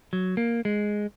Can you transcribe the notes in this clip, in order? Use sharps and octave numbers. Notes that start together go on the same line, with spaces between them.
F#3
A#3
G#3